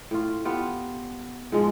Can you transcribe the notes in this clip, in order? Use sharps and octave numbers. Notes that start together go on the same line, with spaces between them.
A2 F4
B3 F4 G4
G#2 F3 G#3